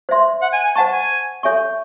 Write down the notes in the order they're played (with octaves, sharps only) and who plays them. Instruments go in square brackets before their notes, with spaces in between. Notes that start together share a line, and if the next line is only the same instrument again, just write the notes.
[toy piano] C5 E5 C6
[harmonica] F#5
G#5
G#5
[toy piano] C5 F#5 C#6 [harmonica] A5
[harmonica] G#5
[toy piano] A4 C#5 E5 G#5 C#6